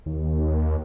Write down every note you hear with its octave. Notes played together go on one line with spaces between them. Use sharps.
D#2